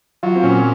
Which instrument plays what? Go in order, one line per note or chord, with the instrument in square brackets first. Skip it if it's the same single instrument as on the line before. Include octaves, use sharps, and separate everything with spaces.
[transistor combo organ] F#3 [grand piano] F4
[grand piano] C4
[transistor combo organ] A#2 [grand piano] C#4